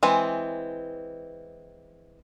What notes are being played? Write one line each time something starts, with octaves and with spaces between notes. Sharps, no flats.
E3 G#3 C4